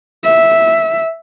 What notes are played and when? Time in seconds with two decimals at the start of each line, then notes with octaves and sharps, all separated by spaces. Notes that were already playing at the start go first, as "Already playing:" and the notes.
0.23 E5